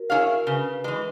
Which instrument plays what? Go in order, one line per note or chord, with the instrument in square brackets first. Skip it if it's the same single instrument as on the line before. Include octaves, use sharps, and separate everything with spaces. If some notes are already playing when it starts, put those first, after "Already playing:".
Already playing: [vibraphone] F#4 A#4
[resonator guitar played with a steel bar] E4 G#4 C#5 F5
[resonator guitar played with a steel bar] C#3 [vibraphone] B4
[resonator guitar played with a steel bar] E3 G#3